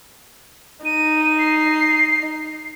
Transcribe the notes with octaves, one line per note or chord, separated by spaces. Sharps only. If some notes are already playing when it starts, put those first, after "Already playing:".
D#4 D#7
C7